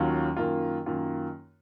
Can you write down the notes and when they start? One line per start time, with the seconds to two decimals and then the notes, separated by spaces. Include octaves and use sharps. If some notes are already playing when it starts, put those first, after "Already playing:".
Already playing: D#2 D#3 F#3 C#4 F4
0.36 F#2 D#3 A#3 F4
0.86 F#2 D#3 A#3 F4